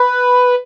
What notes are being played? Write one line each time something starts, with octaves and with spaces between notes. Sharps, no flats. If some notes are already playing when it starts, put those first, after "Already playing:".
Already playing: B4